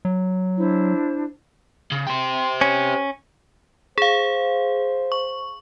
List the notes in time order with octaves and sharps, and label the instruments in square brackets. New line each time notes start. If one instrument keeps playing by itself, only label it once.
[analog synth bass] F#3
[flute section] D4 E4 C5
[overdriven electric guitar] C#3
G4 C5
[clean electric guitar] C#4
[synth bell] G#4 F5 [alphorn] C5
[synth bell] C#6